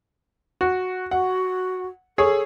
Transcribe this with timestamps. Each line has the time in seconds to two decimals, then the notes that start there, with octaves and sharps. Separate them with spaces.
0.61 F#4
1.11 F#4 F#5
2.18 G#4 A4 C#5